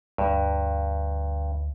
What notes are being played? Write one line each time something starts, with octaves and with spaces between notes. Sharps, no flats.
D2 G2